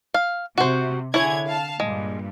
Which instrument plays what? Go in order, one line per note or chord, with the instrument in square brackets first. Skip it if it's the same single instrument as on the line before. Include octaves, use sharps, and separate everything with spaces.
[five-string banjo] F5
[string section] C3 [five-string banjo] F#4 C5
[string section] D3 G#4 G#6 [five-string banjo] E4 C#5
[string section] F5 A5
[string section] G2 A#2 [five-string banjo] G#3